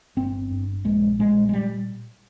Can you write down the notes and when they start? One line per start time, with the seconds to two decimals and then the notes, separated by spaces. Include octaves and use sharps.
0.17 G1 C4
0.50 G2
0.85 A#1 G#3
1.19 A#2 G#3
1.49 G#3
1.53 G3